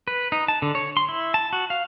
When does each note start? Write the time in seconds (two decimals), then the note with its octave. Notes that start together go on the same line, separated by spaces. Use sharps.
0.08 B4
0.32 D#4
0.48 A5
0.62 D3
0.75 C#5
0.97 C6
1.09 E4
1.34 A5
1.53 F#4
1.70 F5